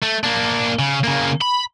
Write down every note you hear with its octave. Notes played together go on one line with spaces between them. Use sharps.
A3
A#3 D4
C#3
C#3 A#3
B5